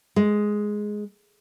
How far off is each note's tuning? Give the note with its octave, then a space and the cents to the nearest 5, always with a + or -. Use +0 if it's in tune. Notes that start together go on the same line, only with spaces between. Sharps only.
G#3 +5